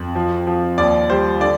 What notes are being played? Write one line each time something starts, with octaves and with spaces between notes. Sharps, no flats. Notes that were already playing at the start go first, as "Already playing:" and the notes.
Already playing: F2
F3
F3
D#2 D5
G3 C5
D3 D5